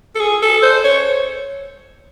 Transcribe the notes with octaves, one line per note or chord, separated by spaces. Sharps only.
A4
G#4
A4
C5
C#5